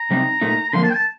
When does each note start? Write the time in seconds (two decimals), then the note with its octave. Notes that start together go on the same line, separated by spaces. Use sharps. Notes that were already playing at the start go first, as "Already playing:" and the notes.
Already playing: A#5
0.11 C3 G3 C4 D#4
0.41 A#2 A3 D#4
0.69 A#5
0.73 D3 F3 A#3 C6
0.83 A5
0.89 G5
0.94 A5